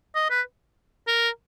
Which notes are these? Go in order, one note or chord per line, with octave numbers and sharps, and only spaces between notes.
D#5
B4
A#4